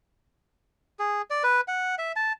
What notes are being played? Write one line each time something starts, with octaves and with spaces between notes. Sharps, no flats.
G#4
D5
B4
F#5
E5
A5